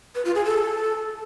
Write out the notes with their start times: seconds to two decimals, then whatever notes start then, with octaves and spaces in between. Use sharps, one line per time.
0.15 B4
0.25 F4
0.35 G#4
0.45 A4